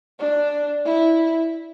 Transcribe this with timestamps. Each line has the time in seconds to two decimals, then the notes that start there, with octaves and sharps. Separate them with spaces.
0.19 D4
0.85 E4